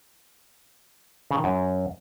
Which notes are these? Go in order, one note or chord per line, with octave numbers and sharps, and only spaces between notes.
C#3
D#3
F#2